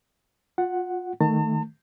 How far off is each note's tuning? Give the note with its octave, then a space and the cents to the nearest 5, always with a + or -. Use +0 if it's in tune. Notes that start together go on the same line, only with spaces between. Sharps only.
F4 +30 F#5 +0
D#3 +0 A3 +0 A5 +40